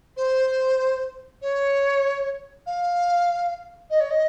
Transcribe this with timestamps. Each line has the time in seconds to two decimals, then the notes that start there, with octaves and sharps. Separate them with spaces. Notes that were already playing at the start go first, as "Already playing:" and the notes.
0.17 C5
1.42 C#5
2.66 F5
3.90 D#5
4.00 C#5
4.10 D#5